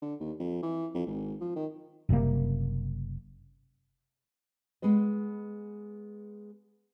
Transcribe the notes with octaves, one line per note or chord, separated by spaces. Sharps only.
D3
D#2
F2
E3
F2
G#1
F3
D#3
F#1 C3 G3 A#3
G#3 B3 B4 D#5